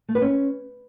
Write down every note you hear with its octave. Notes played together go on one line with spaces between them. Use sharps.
A3
B4
C#4